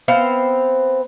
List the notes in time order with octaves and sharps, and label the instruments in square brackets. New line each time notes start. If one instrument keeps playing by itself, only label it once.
[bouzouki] B3 C4 C5 F5